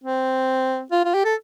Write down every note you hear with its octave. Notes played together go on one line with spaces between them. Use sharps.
C4
F4
F4
G4
A4